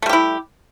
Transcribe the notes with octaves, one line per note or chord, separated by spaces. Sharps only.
G3 A3 E4 G4